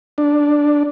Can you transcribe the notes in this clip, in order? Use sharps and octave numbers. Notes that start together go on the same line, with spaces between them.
D4